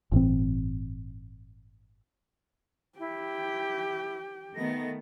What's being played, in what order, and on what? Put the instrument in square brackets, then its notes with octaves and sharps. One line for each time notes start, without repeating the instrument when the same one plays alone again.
[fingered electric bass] G1 A2 E3 C4
[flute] E4 [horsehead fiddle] G4 G5
[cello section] D#3 A3 B3 [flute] A#6